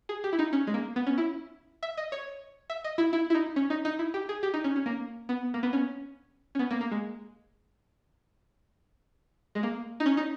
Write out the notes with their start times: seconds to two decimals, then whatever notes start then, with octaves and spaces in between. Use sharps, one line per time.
0.09 G#4
0.24 G4
0.33 E4
0.39 D#4
0.53 C#4
0.67 G#3
0.74 A#3
0.96 B3
1.07 C#4
1.18 E4
1.83 E5
1.97 D#5
2.12 C#5
2.70 E5
2.84 D#5
2.98 E4
3.13 E4
3.30 E4
3.34 D#4
3.56 C#4
3.70 D#4
3.85 D#4
3.99 E4
4.14 G4
4.29 G#4
4.43 G4
4.54 D#4
4.64 C#4
4.76 C#4
4.86 A#3
5.29 B3
5.54 A#3
5.63 B3
5.73 C#4
6.55 C#4
6.59 B3
6.71 A#3
6.81 A#3
6.92 G#3
9.55 G#3
9.63 A#3
10.00 D#4
10.06 C#4
10.17 D#4